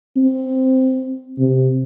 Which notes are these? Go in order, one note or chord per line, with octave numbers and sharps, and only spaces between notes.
C4
C3